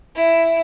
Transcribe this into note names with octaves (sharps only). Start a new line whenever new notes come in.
E4